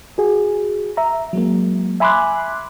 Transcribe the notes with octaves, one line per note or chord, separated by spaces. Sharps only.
F#4 G#4
E5 A#5
F#3 G#3 A#3
E5 G#5 B5 C6 D6 F#6